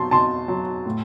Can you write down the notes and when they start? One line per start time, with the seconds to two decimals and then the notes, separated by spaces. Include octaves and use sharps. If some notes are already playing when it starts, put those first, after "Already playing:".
Already playing: B2 F#3 A5 C6
0.11 B2 A5 C6
0.48 F#3
0.86 A2